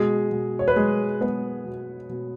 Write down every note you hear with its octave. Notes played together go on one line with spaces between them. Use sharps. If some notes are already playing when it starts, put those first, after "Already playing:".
Already playing: B2 G#3 G#4
B2
C#5
B4
G#3 G#4
G#3 B3 B4
B2
B2